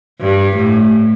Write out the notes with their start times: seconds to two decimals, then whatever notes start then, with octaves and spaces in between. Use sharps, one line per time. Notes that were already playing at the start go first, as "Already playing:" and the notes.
0.20 G2
0.57 A2